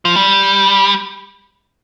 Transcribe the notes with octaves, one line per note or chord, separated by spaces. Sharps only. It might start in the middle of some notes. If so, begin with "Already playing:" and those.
F3
G3